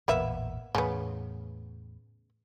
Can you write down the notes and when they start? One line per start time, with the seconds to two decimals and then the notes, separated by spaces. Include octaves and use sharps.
0.08 A1 E2 A#2 A#3 B3 E5
0.75 E2 A2 C#3 B3